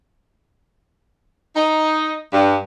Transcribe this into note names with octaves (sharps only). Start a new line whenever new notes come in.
D#4
G2